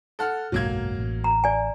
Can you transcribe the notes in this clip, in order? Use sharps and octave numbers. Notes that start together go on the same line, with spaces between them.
A4 F#5 F6
F#1 B1 G#2 F#3 A#3 G#6
A1
A#5
D5 G#5